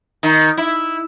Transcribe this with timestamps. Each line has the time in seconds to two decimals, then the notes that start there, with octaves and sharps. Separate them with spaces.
0.23 D#3
0.57 E4